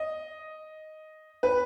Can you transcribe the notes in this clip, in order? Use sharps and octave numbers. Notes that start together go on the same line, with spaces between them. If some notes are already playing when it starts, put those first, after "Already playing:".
Already playing: D#5
B4